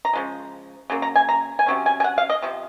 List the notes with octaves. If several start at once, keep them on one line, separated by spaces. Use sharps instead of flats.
A#5
C#3 F3 G#3
C#3 F#3 A#3
A#5
G#5
A#5
G#5
C3 F#3 C#4
G#5
G#5
F#5
F5
D#5
C3 F3